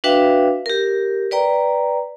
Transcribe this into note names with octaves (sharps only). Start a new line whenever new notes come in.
D4 F#4 B4 E5 F5 G5
G4 A#4
B4 D5 G5 A#5